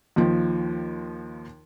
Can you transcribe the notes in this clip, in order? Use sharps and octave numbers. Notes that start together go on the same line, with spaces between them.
D#2 D#3 F3